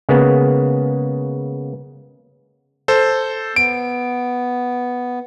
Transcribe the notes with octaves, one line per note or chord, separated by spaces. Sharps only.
C#3 G#3 A#3 B3
A4 C5
B3 D7